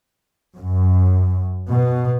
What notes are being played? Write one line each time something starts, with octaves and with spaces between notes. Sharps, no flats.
F#2
B2